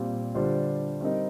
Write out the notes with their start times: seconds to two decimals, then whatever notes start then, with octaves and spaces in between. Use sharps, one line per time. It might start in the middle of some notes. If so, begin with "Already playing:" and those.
Already playing: A#2 G3 C4
0.35 D3 G3 D4 F4 C5
1.01 G3 C4 D#4 A#4